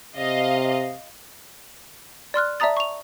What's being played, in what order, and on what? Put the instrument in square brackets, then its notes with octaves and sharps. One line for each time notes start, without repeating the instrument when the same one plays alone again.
[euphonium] C3 [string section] D#5 F5
[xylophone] D5 C6 F6 F#6
D5 E5 A5 A#5 D#6 A6
C#6 F7